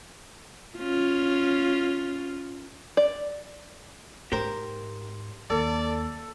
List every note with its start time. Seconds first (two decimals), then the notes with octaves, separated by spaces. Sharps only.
0.78 C#4 F4
2.97 D5
4.32 G#2 G4 A#4 C5
5.50 D#2 A4 D5